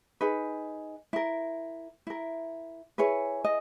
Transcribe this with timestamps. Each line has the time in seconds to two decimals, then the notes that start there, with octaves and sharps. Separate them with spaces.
0.21 D#4 G#4 B4
1.13 E4 A#4
2.07 E4 A#4
2.98 E4 G#4 B4 C#5
3.44 D#5